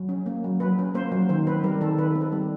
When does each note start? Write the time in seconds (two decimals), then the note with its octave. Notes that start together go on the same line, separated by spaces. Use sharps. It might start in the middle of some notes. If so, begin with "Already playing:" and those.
Already playing: F#3
0.09 C#4
0.26 A#3
0.44 F#3
0.60 F#3 B4
0.79 C#4
0.95 A#3 C5
1.12 F#3
1.29 D#3 C5
1.47 C4 B4
1.64 G3 A#4
1.81 D#3 A4
1.98 D#3 B4
2.15 C4
2.21 A4
2.32 G3